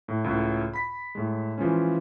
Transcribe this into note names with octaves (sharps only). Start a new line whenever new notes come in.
A2
C#2 A2
B5 B6
A2 G#3
E3 F3 G#3 C#4